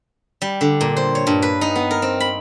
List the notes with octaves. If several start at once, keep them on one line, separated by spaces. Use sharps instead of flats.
G3
D3
A#2
C5
C#5
G2
B4
D#4
B3
A#4
C4
B5